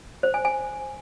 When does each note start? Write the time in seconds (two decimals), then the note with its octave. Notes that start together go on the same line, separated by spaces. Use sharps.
0.23 C5
0.34 G#5
0.45 G#5